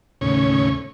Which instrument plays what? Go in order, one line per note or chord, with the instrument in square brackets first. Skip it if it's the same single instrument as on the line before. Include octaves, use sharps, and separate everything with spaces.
[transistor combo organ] D#2 A2 C#3 C#4 C#5